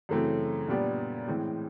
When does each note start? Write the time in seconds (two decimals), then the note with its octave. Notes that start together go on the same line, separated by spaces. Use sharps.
0.09 F#2 C#3 E3 A3 C4
0.68 A#2 G3 B3 D4 G4
1.28 A2 E3 G#3 C4